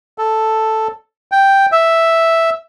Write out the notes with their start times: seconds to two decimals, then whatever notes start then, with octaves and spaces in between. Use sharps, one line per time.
0.18 A4
1.32 G5
1.72 E5